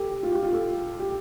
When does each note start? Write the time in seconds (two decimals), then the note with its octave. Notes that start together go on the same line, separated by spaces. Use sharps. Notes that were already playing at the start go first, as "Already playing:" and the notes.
Already playing: G4 A4
0.23 F4
0.32 G4
0.43 F4
0.53 A4
0.99 G4